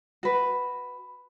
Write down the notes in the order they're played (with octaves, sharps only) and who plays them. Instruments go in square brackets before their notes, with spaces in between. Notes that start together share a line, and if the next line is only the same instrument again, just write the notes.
[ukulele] F#4 B4